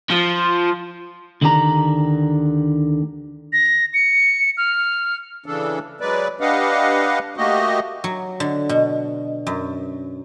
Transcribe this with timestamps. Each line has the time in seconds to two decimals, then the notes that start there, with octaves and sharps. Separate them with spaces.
0.10 F3
1.42 D2 D3 D#3 D4 G4 A#5
3.53 A#6
3.94 C#7
4.57 F6
5.46 C#3 E3 D4 A4
6.01 F#3 G#3 B4 D5
6.41 D4 G4 B4 D#5 F5 F#5
7.37 A3 A#3 F#4 G4 D#5
8.04 F#3
8.40 D3
8.69 B2
9.47 F#2